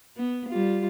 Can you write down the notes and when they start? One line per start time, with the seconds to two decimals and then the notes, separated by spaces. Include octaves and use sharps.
0.17 B3
0.49 G3 F4